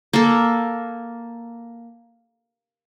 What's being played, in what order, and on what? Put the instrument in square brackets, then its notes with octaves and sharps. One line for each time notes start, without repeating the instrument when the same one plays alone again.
[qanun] A#3 A4